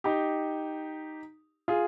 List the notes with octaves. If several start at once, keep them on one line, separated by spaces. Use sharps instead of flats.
D#4 G4
F4 G#4